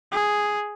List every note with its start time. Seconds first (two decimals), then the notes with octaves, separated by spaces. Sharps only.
0.12 G#4